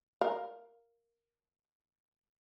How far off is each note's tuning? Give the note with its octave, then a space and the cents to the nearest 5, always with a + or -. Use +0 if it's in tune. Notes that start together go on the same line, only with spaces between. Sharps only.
A#4 +0 F5 +0